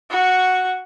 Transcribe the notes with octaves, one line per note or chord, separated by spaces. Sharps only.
F#4 C#6